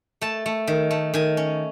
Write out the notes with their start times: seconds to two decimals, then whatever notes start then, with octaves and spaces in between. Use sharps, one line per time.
0.21 A3 A5
0.46 A3
0.67 D#3
0.91 A3
1.14 D#3 G#5
1.37 C#4